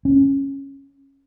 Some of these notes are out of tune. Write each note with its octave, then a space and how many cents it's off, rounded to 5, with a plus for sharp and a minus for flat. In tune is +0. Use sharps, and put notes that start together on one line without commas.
C#4 -10